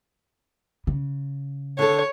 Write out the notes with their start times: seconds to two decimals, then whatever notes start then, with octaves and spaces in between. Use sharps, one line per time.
0.87 C#3
1.79 D3 A4 C#5